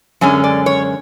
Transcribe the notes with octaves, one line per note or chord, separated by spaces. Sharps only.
F#2 D3 G#3 C#4 G#5
D5
C#5